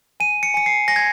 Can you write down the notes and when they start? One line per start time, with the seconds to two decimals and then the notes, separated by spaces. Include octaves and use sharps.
0.20 G#5 D#7
0.43 C#7
0.54 G#5 C#7
0.66 C7
0.88 G#5 A#6
0.96 G#6